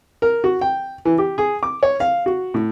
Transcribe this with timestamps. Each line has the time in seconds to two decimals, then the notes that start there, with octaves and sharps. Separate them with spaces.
0.22 A#4
0.44 F#4
0.61 G5
1.05 E3
1.18 G4
1.38 G#4
1.63 D6
1.83 C#5
2.00 F5
2.26 F#4
2.54 A2